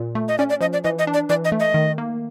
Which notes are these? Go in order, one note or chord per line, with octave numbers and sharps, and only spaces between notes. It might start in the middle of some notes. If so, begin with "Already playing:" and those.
Already playing: A#2
A3
D#5
C#4 D5
D5
F3 D#5
D5
E3 D#5
D#5
D4
D5
E3 D5
D#5
A3
D#5
D#3
A#3